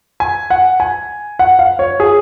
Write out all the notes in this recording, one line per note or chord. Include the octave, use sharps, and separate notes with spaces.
G#5
F#5
G#5
F#5
F5
C#5
G#4